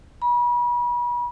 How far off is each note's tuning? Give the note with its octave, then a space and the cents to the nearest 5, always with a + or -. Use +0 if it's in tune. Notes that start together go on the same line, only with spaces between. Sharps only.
B5 -35